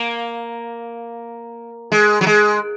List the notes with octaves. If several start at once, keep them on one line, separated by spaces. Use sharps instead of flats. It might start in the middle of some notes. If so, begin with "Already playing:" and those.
Already playing: A#3
G#3
F#3
G#3